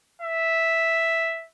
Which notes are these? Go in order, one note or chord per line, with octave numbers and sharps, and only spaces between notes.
E5